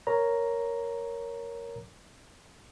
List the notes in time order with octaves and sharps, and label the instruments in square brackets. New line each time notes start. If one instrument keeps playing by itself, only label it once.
[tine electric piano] A#4 C#5 A#5